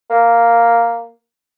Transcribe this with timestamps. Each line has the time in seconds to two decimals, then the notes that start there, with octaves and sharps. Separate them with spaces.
0.10 A#3